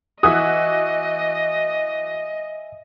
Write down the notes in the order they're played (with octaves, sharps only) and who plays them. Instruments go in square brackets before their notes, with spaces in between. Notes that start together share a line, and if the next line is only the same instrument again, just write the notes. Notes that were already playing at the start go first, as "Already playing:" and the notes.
[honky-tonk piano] E3 F#4 [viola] D#5 [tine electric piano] E5 G#5 [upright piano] D#6